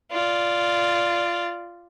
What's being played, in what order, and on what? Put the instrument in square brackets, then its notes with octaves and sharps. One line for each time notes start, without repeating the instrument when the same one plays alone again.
[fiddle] F4 D5